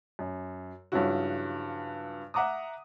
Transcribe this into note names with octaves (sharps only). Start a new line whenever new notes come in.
F#2
G2 C#3 F3 F#3 E4 F#4
E5 F#5 A#5 D6 D#6